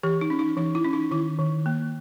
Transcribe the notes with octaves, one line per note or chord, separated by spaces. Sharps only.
E3 G4
D#4
C#4
D#4
E3 D#4
E4
C#4
D#4
D#3 E4
D#3
A#3